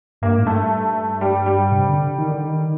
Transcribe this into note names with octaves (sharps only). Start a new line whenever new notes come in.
G2 A#3
A2
G2 A3
G3
G3
C3
D3
D#3
D3
D#3